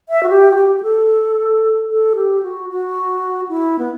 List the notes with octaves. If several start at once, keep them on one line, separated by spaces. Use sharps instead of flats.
E5
F#4
G4
F#4
G4
G4
A4
A4
G4
F#4
F#4
E4
B3